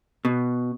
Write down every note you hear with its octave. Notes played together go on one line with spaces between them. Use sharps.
B2